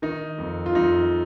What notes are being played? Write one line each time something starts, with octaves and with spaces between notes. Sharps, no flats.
D#3 D#4
F2
F4
F2 D#4